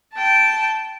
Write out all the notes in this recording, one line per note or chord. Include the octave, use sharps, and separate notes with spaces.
G5 A5